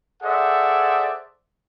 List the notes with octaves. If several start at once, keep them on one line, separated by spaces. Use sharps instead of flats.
G#4 A4 C5 D5 E5 F#5